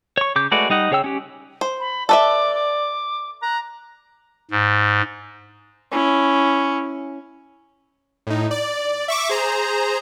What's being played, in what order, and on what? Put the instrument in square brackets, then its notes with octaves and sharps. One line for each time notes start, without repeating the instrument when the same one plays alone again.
[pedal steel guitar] C#5 C#6
C#3 D6 G6
G#3 A3 F#4 B4 D5
G3 D#4 D#5 F#5
C#3 G#4 C#5 G5 E6
C#4 G4
[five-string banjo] C5
[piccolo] B5
[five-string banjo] A4 B4 E5 [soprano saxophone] D5 [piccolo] D6
[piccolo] D6
[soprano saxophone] A#5 [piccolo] F#6
[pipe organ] G#2
[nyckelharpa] C#4 E4
[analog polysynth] A2 D#4
D5
E5 C#6 D6
G#4 C5 A#5